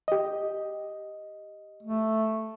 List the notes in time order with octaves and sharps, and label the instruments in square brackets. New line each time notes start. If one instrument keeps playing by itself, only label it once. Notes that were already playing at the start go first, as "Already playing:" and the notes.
[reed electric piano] G4 D#5
[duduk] A3